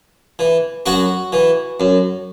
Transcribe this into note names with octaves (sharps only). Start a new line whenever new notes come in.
E3
F#2 F#4 F#5
E3
F#2